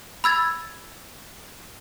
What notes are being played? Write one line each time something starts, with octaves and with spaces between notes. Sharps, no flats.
B5 E6 G#6 A6